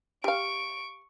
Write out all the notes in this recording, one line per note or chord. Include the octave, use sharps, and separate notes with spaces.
G4 F5 C#6 D7